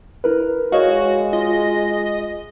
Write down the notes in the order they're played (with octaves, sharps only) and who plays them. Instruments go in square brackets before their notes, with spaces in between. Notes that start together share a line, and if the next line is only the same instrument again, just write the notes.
[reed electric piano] E4 A#4 B4
[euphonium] G#3 [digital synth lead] F#4 [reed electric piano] C#5 D#5 F5
[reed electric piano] F4 [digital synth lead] D#5